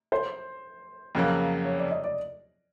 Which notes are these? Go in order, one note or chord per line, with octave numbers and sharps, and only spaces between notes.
C5
F2 C#3 F#3 A#3
C#5
D5
D#5
D5